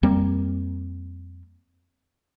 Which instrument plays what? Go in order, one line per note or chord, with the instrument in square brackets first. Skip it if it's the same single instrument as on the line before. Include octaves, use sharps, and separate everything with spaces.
[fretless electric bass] F2 G3 A#3 C4